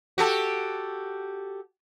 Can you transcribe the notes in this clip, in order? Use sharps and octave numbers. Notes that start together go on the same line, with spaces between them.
F#4 G4 A4